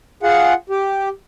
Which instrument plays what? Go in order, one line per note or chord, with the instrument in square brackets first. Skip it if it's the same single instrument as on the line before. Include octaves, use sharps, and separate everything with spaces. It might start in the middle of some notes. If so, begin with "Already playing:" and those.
[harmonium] F4 G#4 F#5
G4